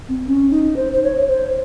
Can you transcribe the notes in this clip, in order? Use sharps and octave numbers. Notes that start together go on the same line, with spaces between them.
C4
C#4
D#4
C5
C5
C#5
C5